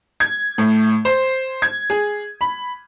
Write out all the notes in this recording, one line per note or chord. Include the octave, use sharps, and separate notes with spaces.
G#6
A2
C5
G#6
G#4
B5